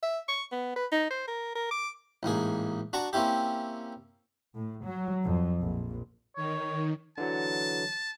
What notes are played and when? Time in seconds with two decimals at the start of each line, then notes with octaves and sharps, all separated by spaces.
0.03 E5
0.28 C#6
0.52 B3
0.76 B4
0.92 D#4
1.10 C5
1.28 A#4
1.55 A#4
1.71 D6
2.23 A1 G#2 A#3 G#4
2.93 D4 F#4 A5 A#5 C#6
3.13 A#3 C4 C#4 E4 G4
4.55 A2
4.83 F#3
5.24 F2
5.62 A#1
6.37 D#3 C#5
7.18 D3 E3 F#3 A5